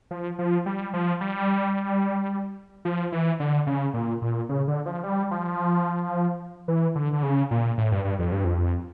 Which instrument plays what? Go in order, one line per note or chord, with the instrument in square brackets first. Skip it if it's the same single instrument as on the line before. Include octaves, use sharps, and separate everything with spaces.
[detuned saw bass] F3
F3
G3
F3
G3
F3
E3
D3
C#3
A#2
A#2
C#3
D3
F3
G3
F3
E3
D3
D3
C#3
A#2
A2
G2
G2
F2
G2
F2